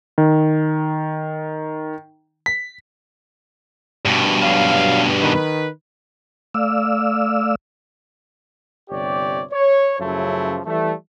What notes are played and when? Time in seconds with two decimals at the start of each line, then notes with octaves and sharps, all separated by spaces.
0.18 D#3
2.46 B6
4.05 G2 B2
4.42 F#3 F5
5.20 D#3 B4
6.54 A3 D5 F5 E6
8.90 G1 C3 G4 C#5 D5
9.51 C#5
10.00 F#2 C#3 F3 A3 E4
10.65 E3 G3 A3